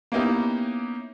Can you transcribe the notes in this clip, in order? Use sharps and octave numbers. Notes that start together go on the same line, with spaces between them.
A#3 B3 C#4 D#4 E4 G4